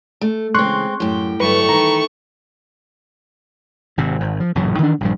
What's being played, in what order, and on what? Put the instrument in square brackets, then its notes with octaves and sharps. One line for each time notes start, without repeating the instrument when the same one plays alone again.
[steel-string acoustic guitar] A3
[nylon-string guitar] C#3 E3 [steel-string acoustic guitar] G#3 C4 [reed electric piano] C6 C#6 F#6
[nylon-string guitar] F#2 [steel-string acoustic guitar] A2 G4
[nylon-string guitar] G2 D3 F#3 [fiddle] A3 C#6 [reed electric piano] B4
[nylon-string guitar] D#3 E3 [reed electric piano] A#5
[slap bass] G#1 C3
G#1
F3
A1 F#2 A#2 C#3
D#3 E3 G3 D4
A#1 G2 F3